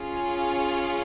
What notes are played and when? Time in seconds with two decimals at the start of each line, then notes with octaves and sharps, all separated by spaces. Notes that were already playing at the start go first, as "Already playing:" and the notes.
Already playing: C#4 F4 G#4